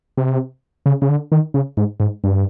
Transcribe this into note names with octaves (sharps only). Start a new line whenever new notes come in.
C3
C#3
C#3
D3
D#3
C#3
G#2
G#2
G2